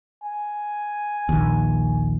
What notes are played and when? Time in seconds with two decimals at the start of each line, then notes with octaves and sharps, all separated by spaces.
0.24 G#5
1.29 A#1 D#2